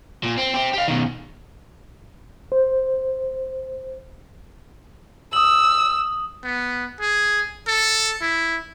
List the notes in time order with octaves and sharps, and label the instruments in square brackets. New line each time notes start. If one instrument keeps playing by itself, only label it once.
[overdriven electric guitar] A#2
C4
C4 G4
G4 F5
B2 D#3
[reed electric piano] C5
[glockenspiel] D#6 F#7 [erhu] E6
[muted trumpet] B3
G#4
A4
E4